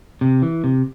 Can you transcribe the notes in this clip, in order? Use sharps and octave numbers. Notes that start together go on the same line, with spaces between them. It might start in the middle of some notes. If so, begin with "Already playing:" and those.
C3
E3
C3